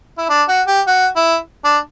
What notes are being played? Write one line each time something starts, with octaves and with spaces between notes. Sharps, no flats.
E4
D4
F#4
G4
F#4
E4
D4